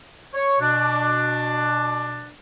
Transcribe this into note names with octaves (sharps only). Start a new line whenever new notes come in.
C#5
B2 D4